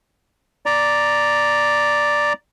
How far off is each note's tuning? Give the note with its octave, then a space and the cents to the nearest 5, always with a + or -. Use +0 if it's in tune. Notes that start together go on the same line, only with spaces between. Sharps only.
D5 +0 A#5 +0